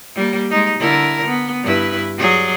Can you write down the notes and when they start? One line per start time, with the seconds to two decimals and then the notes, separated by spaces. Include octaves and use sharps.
0.15 G3 A#3
0.51 G#3 D#4
0.79 D3 E4 A#4
1.27 B3
1.63 G2 E4 B4
2.18 F#3 G#4 D5